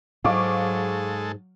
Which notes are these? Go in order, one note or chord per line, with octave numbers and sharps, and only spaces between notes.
G#2 F#3 G#3 A4 F5 C#6 D6